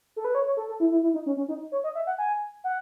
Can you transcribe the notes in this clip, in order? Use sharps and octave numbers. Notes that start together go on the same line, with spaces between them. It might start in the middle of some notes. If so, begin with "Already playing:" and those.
A4
B4
C#5
C#5
A4
A4
E4
E4
E4
D#4
C#4
C#4
D#4
C#5
D#5
E5
F#5
G#5
F#5